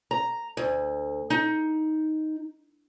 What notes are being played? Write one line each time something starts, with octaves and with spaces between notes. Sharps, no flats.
A#5
D2
D#4